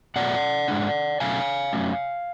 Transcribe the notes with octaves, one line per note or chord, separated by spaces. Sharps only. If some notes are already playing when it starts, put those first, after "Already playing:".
B2 F#3 A3 D5 F#5
G#2 G#3 D4
B2 F#3 A3 C#4 F5 G#5
F#2 C#3 F#3 A3 C#4